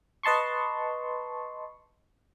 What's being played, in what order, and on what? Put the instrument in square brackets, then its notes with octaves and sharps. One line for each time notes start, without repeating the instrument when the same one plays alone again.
[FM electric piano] B4 D#5 A5 C6 C#6